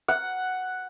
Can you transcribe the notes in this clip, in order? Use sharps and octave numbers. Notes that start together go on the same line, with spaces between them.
F#5